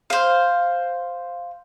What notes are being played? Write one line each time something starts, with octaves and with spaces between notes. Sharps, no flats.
C5 F5